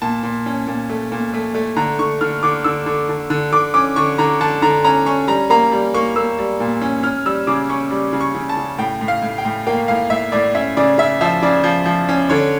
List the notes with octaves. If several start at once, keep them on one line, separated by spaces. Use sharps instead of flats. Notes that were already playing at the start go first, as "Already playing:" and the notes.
A#2 A5
A#2
C#4
A#2
A3
A#2
A3
A3
D3 A#5
D3 C#6
D3 F6
D3 D6
D3 E6
D3
D3
D3
D3 D6
C#4 D6
D3 C#6
D3 A#5
D3 A5
D3 A#5
C#4 A#5
C#4 C#6
G3 A#5
A#3 A#5
G3
A#3 C#6
A#3 E6
G3
A#2
C#4
C#4 F6
G3 E6
C#3 D6
C#4 C#6
G3
C#3
C#6
C#3
A5
C#3
A2 G5
A2
F5
A2
G5
A2
A#3 G5
A2 F5
A2 E5
A2 D5
C#4 E5
C#3 D5
C#3 E5
F3 E5
C#3 D5
F3
F3
C#4
D3 C#5